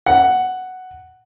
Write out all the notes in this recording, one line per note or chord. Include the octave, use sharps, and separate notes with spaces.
F#5